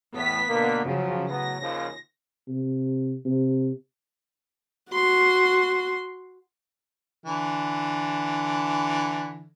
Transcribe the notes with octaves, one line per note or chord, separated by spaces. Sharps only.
E2 A2 B3 B6
B2 D3 A#3
C#3 F3 F#3
A2 F#3 B3 A#6
D#2 C#3 F3
C3
C3
F#4 C6
D3 E3